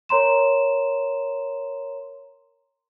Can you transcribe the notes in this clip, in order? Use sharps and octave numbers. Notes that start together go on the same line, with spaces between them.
A#4 C#5 A#5 C6 E7